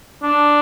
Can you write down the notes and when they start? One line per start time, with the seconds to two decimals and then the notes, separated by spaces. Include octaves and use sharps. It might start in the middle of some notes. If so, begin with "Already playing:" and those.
0.23 D4